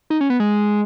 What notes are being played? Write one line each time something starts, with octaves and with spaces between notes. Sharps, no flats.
D#4
C#4
B3
G#3